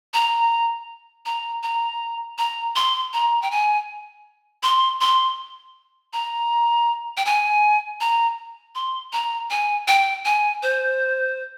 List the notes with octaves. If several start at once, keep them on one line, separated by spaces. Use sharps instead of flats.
A#5
A#5
A#5
A#5
C6
A#5
G5
G#5
C6
C6
A#5
G5
G#5
A#5
C6
A#5
G#5
G5
G#5
C5